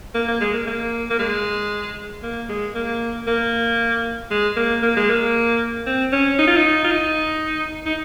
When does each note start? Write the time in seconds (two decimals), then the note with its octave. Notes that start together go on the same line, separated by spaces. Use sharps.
0.14 A#3
0.28 A#3
0.41 G#3
0.54 A#3
0.67 A#3
1.10 A#3
1.19 G#3
2.23 A#3
2.49 G#3
2.75 A#3
3.27 A#3
4.31 G#3
4.56 A#3
4.83 A#3
4.96 G#3
5.10 A#3
5.86 C4
6.12 C#4
6.39 D#4
6.47 F4
6.56 D#4
6.84 F4
6.91 D#4
7.86 D#4